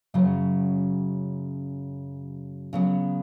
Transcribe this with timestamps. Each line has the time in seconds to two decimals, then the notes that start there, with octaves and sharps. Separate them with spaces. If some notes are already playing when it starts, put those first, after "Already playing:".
0.14 F#2 C#3 F#3
2.73 C#3 F#3 B3